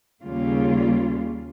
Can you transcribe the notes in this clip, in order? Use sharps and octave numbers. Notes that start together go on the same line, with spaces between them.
D#2 C#3 G3 A#3 F4